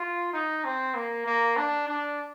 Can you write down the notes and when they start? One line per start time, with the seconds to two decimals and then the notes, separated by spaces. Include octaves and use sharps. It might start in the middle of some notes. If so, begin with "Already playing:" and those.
Already playing: F4
0.33 D#4
0.65 C4
0.95 A#3
1.26 A#3
1.57 D4
1.87 D4